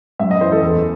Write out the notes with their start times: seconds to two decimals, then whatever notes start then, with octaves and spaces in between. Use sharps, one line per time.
0.19 F#2 E5
0.31 D#5
0.41 E3 C5
0.52 A4
0.62 E2